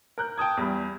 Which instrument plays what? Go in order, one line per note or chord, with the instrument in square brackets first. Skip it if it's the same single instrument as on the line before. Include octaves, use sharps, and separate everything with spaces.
[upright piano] A#4 F#6 G6
G5 A5 D#6 G#6
E2 G3 B5